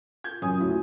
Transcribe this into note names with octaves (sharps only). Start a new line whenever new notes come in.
G6 G#6
F#2 C#4 G#5 D#6
D2 E4 F#4